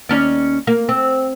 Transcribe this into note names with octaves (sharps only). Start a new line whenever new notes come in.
D#2 C#4 D5
A#3
C4